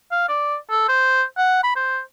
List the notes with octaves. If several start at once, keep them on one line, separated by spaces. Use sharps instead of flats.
F5
D5
A4
C5
F#5
B5
C5